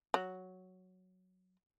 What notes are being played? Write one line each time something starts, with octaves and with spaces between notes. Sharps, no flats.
F#3